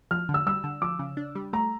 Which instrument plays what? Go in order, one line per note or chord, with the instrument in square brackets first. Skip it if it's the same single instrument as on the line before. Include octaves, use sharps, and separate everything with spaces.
[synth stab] F3 [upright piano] F6
[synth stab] D3
[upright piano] E6
[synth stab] G3 [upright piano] E6
[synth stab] D3
[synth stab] F3 [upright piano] D6
[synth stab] C#3
D4
G3
[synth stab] A3 [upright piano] A#5